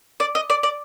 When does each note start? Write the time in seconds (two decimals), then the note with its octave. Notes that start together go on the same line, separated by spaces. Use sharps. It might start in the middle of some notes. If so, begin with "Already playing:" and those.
0.20 D5
0.35 D#5
0.50 D5
0.63 D5